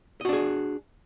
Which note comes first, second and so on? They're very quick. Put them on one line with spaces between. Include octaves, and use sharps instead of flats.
D#5 F#4 D4 G#4